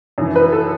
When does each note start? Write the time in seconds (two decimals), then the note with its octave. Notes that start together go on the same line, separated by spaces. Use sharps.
0.18 F#2 E3
0.36 B4
0.52 A4